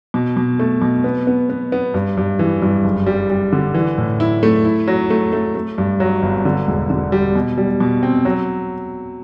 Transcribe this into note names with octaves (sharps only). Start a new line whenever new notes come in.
B2
B2
A3
B2
B3
B3
B3
B3
G2
G2
E3
G2
F#1
G3
G3
D3
E3
A2
E4
A3
E4
F#3
A3
A3
A3
G2
F#3
G1
D3
E1
D3
G3
B2
G3
B2
C4
F#3